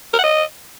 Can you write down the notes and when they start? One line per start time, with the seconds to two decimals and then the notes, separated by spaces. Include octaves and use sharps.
0.14 A#4
0.19 F#5
0.24 D#5